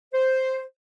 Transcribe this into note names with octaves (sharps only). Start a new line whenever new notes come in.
C5